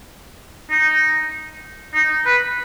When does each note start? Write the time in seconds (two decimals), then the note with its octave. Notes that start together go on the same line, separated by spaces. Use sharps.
0.70 D#4
1.94 D#4
2.26 B4